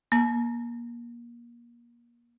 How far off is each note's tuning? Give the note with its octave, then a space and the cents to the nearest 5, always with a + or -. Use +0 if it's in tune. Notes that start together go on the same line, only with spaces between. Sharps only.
A#3 +25 A#5 +0